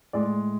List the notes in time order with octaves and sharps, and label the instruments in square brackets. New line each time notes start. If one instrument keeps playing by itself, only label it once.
[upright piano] A2 G#3 D5